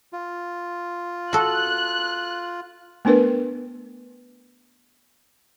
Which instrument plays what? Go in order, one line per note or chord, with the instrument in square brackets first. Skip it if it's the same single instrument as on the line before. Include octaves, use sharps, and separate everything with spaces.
[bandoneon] F4
[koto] F#4 A4 [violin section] F#6
[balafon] A3 B3 D4 A#4 B4